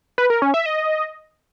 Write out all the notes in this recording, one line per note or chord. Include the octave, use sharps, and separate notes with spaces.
B4
A#4
C#4
E5
D#5